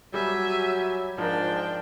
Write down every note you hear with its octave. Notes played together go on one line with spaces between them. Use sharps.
F#3 G3 E5 G#5
G#2 F3 D4 A#4 G5